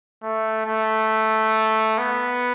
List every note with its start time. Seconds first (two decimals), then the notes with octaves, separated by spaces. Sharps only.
0.23 A3
0.66 A3
1.98 B3